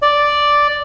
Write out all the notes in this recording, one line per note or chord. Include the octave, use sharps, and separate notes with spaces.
D5